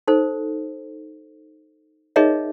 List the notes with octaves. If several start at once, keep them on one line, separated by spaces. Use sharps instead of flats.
D#4 A4 C5
D#4 G#4 A#4 C#5 D#5 E5